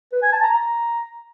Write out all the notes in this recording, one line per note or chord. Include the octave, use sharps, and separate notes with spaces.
B4
G#5
A5
A#5
A#5